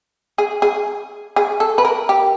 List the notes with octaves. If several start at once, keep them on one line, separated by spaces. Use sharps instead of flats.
G#4
G#4
G#4
A4
B4
A#4
G4